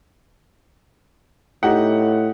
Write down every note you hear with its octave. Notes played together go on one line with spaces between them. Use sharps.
A2 D#4 G4 F#5